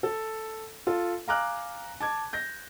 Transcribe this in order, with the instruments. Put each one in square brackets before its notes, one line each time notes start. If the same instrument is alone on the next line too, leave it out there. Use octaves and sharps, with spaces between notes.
[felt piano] A4
F4 A4
F5 G#5 A#5 D6 F6 F#6
A5 D6 G#6
G6 A#6